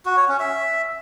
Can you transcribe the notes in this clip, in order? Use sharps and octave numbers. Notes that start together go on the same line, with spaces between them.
F#4
C#5
C#4
E5